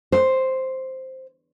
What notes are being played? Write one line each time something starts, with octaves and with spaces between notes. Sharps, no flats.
C5